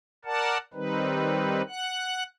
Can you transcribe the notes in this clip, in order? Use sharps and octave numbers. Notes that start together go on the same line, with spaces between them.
A#4 D5 F#5 A5
D#3 G3 C4 D#4 B4
F#5 F#6